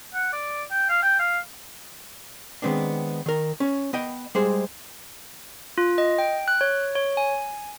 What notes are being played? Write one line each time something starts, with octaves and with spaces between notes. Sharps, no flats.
F#5
D5
G5
F5
G5
F5
D#3 G#3 B3 C4 D4
D#3 A#4
C#4 C#5
B3 D#5 G5
G3 G#3 G#4 C5
F4
D#5
G5
F#6
C#5
C#5
G#5